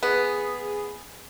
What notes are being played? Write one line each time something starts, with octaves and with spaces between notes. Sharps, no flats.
B3 G#4